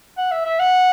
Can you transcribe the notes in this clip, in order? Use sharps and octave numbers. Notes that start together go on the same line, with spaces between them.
F#5
E5
E5
F#5